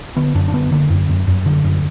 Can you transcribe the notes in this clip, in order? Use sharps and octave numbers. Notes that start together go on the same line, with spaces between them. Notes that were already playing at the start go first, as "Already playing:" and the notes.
D3 B3
F#2 D4
D4
D3 B3
D3 A#3
F#2
F#2
F#2
D3
F#2